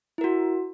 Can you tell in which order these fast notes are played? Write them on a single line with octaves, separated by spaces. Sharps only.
E4 A#4 F#4